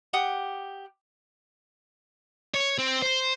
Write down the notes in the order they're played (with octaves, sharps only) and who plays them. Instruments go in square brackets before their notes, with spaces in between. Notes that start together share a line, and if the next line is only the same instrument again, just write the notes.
[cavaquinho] G4 F#5 D#6
[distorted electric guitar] C#5
C4
C5